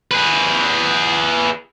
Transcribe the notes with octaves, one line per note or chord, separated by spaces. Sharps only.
G#4 B4